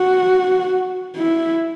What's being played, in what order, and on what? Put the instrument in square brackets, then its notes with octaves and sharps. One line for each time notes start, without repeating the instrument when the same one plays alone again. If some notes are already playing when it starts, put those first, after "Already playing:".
Already playing: [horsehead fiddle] F#4
E4